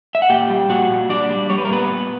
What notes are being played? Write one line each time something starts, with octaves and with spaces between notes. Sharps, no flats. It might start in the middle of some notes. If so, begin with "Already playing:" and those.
E5
F#5
A#2 G4 G5
G3
A#2 F#4 F#5
A#2
G3 D4 D5
G3
G3 C#5
B4
A#4
A#2 B3 B4
A#2